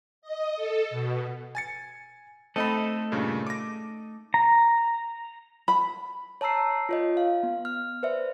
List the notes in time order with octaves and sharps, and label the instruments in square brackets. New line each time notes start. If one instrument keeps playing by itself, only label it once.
[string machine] D#5
A4
B2
[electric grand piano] G#5 A6 C#7
[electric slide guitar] A3 D#4 A4 [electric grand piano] C4 D#5 B5
[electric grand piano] G2 A#2 C#3
D6 A#6
[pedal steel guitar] A#5
[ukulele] B5
[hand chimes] C#5 A5 A#5 E6 C7
F4 C#5 D#5
F5
B3
F6
B4 C5 D5 E5